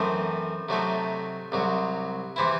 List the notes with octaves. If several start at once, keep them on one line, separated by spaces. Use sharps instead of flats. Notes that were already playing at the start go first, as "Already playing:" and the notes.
Already playing: F#2 E3 A3 C4 D#4
C3 F#3 A3 D#4
C2 C3 F#3
C3 E3 C4 E4